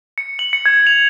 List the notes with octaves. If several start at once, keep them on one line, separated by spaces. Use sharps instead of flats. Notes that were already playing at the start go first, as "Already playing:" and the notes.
C#7
F#7
C#7
G#6
F7